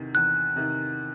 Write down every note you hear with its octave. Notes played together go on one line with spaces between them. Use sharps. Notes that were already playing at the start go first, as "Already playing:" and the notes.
Already playing: E2 C3 D#3
E2 F#6
C3 D#3